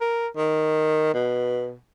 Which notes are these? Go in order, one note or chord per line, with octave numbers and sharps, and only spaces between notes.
A#4
D#3
B2